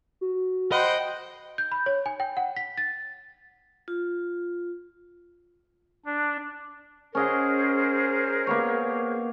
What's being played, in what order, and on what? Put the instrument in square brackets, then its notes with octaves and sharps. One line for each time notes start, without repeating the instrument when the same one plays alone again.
[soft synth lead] F#4
[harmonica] C5 F#5 G5 [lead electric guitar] D#5 [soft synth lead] B5
[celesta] G6
B5
C#5
G#5
G5
F#5
B6
A6
[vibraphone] F4
[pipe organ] D4
[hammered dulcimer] C#4 D#5 F#5 [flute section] G#4 A#4 C5
[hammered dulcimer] A#3 B3 C#5